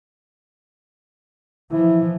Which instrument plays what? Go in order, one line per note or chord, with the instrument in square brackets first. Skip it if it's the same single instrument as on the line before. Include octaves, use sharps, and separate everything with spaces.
[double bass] E3 F3 [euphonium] E4